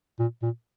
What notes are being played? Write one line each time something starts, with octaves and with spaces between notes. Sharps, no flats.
A#2
A#2